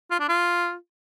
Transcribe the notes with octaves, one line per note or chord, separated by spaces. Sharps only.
F4
D4
F4